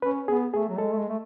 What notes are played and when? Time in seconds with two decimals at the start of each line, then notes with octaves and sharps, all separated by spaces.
0.02 C#4 B4
0.28 B3 G#4
0.54 A3 G#4
0.68 F#3
0.78 G#3 A4
0.92 A3
0.97 G#3
1.09 A3